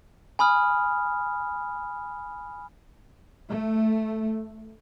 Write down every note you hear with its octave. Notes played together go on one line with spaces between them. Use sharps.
G#5 B5 D#6 F6
A3